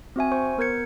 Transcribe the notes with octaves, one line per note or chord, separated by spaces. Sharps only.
C4 F#4 E5 G#5
C5 C#6
B3 A#4 G6 G#6 C#7